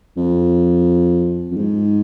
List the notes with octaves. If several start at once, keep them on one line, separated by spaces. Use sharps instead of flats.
F2
F2
G#2